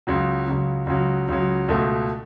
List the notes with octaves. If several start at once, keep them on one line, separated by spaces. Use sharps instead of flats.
C#2 C#3 F#3
C#2 C#3 F#3
C#2 C#3 F#3
C#2 C#3 F#3
C#2 B2 A3